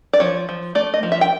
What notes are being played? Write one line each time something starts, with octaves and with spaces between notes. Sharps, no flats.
D5
F3 C#5
F3
A3 D5
D#5
F3
E5
G5